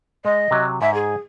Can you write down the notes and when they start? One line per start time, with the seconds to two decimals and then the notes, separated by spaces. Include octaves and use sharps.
0.25 G#3 D#5
0.51 C3 F#3
0.82 G#2 E5 A#5
0.94 G#4